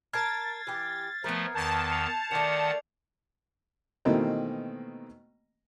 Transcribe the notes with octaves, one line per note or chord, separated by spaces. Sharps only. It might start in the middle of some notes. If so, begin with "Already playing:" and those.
A#4 A5 A#5 F6 G#6 A6 C7
E3 G4
F3 A3 B3 A#4
E2 D#3 A5 G6 F7
C7 C#7 F7
D#3 A3 D4 F#5 D6 F7
B2 D#3 E3 A3 A#3 C4